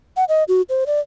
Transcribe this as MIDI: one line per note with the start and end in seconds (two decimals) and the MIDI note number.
0.17 0.24 78
0.29 0.44 75
0.48 0.62 66
0.70 0.84 72
0.87 1.00 74